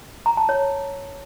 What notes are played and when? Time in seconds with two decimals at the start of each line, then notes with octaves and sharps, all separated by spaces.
0.26 A#5
0.37 A5
0.49 C#5